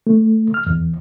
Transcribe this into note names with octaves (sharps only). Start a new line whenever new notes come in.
A3
F6
E2